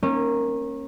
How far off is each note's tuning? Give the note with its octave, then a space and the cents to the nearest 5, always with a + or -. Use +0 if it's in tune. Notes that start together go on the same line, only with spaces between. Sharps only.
A#3 +0 C#4 -25